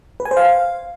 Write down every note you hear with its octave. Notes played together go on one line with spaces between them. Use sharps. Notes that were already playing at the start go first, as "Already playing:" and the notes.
B4
G#5
C5
F5